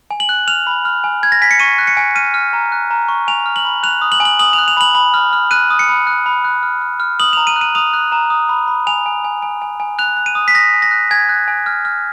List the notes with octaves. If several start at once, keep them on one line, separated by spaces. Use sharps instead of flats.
G#5
F#7
F#6
F6 F7
B5
F6
G#5
G#5 G#6
A#6
G#5 B6
C#7
C#6 D#7
F#6
C#7
G#5
F6 D#7
F6
A#5
F#6
A#5
C#6
G#5 F7
F6
F#7
B5
F#6 F7
D#6
F#7
G#5
F#7
D#6 F#7
F7
F#6
F7
B5 F#7
B5 F#7
F6
F6
F#6 D#7
D#6
C#7
B5
F#6
B5
F#6
F6
F6
F6
D#6 F#7
A#5 F7
D#7
F#6
D#7
D#6 F7
F#6
A#5
D#6
B5
B5
G#5 F7
G#5
G#5
G#5
G#5
G#5
F#6 F7
F#6
D#7
D#6
B6
D#6 A#6
G#5
A#6
F#6
G#5 G#6
F#6
G#5
F6
F6